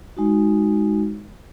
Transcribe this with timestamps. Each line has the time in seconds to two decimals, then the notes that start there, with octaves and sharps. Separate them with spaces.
0.17 G#3 D#4 F#4